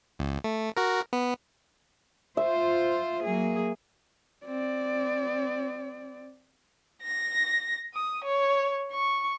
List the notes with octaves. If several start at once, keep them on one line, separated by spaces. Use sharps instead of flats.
C#2
A3
F#4 A#4
B3
F4 C5 E5
F#3 A#3 G#4
C4 D5
A#6
D#6
C#5
C#6